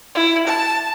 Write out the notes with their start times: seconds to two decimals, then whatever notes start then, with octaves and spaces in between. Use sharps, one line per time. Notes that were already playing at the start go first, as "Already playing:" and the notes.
0.15 E4
0.47 A5